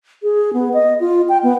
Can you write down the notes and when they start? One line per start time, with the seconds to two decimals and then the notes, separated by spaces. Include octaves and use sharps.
0.23 G#4
0.53 B3
0.74 D#5
1.00 F4
1.29 G5
1.43 B3